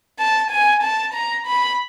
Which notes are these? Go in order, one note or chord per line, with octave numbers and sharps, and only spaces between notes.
A5
G#5
A5
A#5
B5